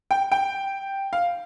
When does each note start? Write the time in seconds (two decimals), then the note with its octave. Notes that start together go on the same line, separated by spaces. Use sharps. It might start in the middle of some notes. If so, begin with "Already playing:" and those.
0.11 G5
0.32 G5
1.13 F5